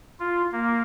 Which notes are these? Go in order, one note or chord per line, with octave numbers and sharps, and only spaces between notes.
F4
A#3